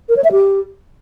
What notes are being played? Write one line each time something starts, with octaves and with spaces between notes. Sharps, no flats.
A#4
C#5
E5
G4